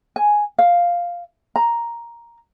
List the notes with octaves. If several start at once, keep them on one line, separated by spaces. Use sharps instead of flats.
G#5
F5
A#5